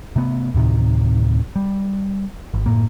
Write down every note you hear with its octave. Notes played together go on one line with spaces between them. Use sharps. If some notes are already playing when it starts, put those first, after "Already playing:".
C3 A3 B3
D2 A2 C3 D#3
G3
G#1
F#1 A2 A#3